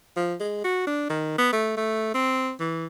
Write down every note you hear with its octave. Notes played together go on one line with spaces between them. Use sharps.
F3
G#3
F#4
D4
D#3
B3
A3
A3
C4
E3